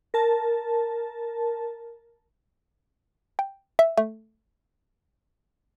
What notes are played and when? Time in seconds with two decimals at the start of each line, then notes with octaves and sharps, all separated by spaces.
0.14 A#4 A5
3.39 G5
3.79 E5
3.98 A3